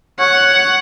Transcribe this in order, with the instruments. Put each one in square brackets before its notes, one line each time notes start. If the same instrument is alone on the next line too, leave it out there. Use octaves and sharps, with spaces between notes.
[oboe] C#5 [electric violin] F#5